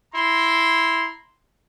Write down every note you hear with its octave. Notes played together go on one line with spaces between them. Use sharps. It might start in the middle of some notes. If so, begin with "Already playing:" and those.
E4 A#5 C6